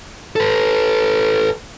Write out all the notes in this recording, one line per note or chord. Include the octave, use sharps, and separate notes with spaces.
A4 B4